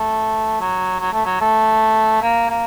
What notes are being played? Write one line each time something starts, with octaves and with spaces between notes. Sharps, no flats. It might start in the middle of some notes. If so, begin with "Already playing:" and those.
Already playing: A3
F#3
F#3
A3
F#3
A3
A#3
A#3